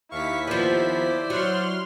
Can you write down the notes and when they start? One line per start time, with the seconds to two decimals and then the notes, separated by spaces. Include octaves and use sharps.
0.11 D#2 E4 F5 C#6 B6
0.47 F3 B3 C5 D5
1.30 F#3 C6 F6